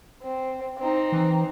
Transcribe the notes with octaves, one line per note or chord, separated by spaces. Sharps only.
C4
C4 D#4
E3